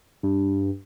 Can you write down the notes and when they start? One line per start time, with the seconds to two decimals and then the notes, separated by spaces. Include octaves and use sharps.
0.23 G2